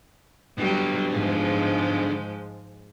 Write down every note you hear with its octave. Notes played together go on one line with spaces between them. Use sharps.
D3 F#3 G3 B3
G#2 F3 G#3